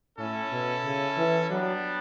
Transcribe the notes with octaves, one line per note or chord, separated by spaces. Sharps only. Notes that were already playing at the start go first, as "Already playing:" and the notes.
A2 C#4 E4 A4
B2
C#3
E3
F#3 G3 B3 D4